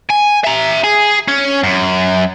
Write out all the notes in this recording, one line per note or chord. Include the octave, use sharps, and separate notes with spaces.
G#5
E5 A#5
G#4
C#4
F#2